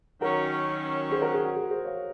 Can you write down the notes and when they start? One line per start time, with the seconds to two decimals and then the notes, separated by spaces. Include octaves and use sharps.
0.21 D#3 F#3 C#4 F#4 A#4
1.11 G#4 C5
1.22 F#4 A#4
1.34 G#4
1.45 F#4
1.56 G#4
1.71 G#4 C5
1.85 C#5 F5